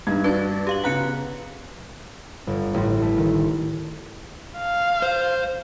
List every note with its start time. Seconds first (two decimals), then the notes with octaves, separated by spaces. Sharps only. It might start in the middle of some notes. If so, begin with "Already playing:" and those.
0.07 G2 D#4 G#6
0.24 D4 F#4 B4 G#6 A6
0.67 G4 F5 F#7
0.84 C#3 B3 F#5 A#5 F#6 C#7
2.47 G1
2.74 A1
3.02 A3
3.18 D#3
4.57 F5
5.02 C5